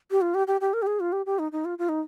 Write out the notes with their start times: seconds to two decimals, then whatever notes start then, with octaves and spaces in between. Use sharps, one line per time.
0.11 G4
0.21 F4
0.34 G4
0.47 G4
0.61 G4
0.74 A#4
0.82 G4
0.87 G#4
1.00 F4
1.12 G4
1.26 G4
1.39 D#4
1.52 D#4
1.65 F4
1.79 F4
1.89 D#4